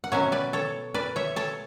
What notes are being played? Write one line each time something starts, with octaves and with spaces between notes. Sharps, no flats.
F#5
B2 F#3 C#4 C#5 E5
B4 D5
A4 C#5
B4 D5
C#5 E5
A4 C#5